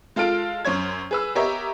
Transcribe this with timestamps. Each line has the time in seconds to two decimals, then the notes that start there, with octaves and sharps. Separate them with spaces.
0.16 G#3 F4 A4 F6 D7
0.65 F#2 C5 C#5 G#6
1.11 G#4 B4 E6
1.35 B3 G4 A#4 C#5 D#5 E5